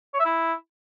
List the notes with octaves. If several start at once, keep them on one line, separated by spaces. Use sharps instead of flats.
C#5
E5
E4